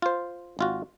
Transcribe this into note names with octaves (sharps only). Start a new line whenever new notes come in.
F4 C5
G#1 F4 F#4